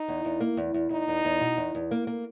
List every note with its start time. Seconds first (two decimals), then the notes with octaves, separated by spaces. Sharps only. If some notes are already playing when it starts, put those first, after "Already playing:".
Already playing: D#4
0.08 E2
0.25 E2
0.41 A#3
0.57 E2
0.74 E2
0.91 E2 D#4
1.08 E2
1.25 E2
1.40 B2
1.57 E2
1.75 E2
1.91 A#3
2.07 A#3